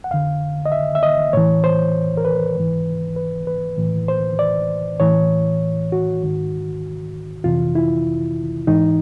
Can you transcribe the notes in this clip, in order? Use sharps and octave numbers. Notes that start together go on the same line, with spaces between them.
F#5
F2 D3 F5
D#5
E5
E5
D#5
A2 E3 C#5
C5
A#4
B4
G#2 E3
B4
B4
A2 E3
C5
D5
A2 E3 C#5
F#4
G#2 D#3
F2 C3 E3 F4
E4
G#2 E3 D#4